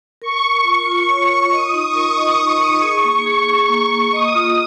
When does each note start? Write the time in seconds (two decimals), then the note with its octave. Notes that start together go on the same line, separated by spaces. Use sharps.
0.22 A#4 C#6
0.43 A#4
0.53 C#6
0.64 F4
0.86 F4
1.09 C#5
1.30 F4
1.52 D#5 D#6
1.74 D#4
1.85 C#6
1.95 A#4
2.17 D#5 C#6
2.39 D#4
2.61 D#4
2.82 G#4
3.04 A#3
3.26 G#4
3.48 G#4 C#6
3.69 A#3
3.80 C#6
3.91 A#3
4.13 D#5 D#6
4.35 F4